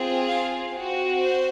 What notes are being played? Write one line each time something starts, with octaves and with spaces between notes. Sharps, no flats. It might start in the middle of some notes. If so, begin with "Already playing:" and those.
Already playing: C4 F4 G#4
F5
C4 F#4
C5